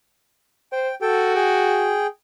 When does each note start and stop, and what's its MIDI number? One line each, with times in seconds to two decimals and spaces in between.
0.72 0.91 72
0.72 0.95 79
1.02 2.00 66
1.02 1.33 69
1.02 1.33 79
1.35 2.07 68
1.35 2.07 79